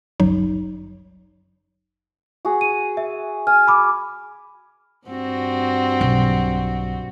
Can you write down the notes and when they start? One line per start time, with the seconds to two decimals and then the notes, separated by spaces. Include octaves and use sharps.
0.20 G1 C2 F#2 F#3 D#4
2.45 F#4 G#4
2.61 D#7
2.97 E5
3.47 G#5 F6
3.68 B5 D6
5.08 G2 C4 F#4
6.01 B1